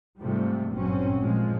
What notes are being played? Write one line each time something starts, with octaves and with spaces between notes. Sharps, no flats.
G#2 C3 F3 G3 A3
G#1 G2 A#2 F#3 C4 C#4
G2 A#2 F3 G#3